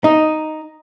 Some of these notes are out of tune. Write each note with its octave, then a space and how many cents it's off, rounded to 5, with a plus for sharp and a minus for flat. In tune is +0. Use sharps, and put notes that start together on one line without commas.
D#4 +0 D#5 +0